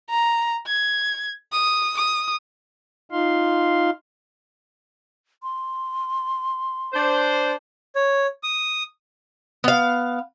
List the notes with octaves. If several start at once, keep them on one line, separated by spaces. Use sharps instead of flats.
A#5
G#6
D#6
D#6
D#4 F4 F5 C6
C6
D4 C5
C#5
D#6
B3 F5